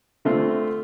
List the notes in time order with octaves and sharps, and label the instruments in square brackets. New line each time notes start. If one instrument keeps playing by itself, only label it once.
[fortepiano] D3 A3 C4 F4